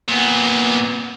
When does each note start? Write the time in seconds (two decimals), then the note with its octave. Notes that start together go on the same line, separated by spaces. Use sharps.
0.09 A#2 B3